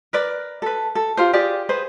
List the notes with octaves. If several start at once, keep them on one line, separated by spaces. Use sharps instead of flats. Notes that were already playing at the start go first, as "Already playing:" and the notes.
A#4 B4 D5
A4 B4
A4
F4 G4 C5
F4 G4 G#4 D5
G#4 B4 C5